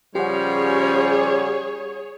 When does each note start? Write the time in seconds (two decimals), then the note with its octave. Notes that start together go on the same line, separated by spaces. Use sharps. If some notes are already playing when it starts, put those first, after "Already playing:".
0.15 C#3 F3 G3 C#4 G4 G#4 C#5 F#5